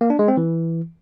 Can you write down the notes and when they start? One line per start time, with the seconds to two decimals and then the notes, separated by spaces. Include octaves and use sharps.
0.01 A#3
0.10 D4
0.19 G#3
0.28 C4
0.37 E3